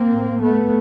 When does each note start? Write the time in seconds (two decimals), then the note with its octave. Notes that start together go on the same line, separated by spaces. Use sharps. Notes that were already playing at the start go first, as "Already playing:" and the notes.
Already playing: A#3 C4
0.10 A2
0.42 A3 B3